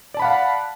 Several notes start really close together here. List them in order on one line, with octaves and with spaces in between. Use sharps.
D5 A5 B5 F#5 F5